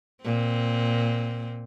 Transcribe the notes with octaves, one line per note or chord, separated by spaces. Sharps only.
A#2 C4